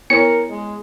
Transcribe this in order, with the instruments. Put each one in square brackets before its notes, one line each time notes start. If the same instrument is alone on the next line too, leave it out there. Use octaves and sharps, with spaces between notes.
[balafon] B3 E4 C#5 [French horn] A#4 [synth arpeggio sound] C#7
[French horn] G#3